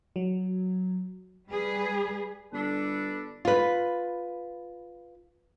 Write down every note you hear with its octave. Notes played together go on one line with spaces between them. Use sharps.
F#3
G3 G#4 B4
G1 D4 A4 B4
F4 B4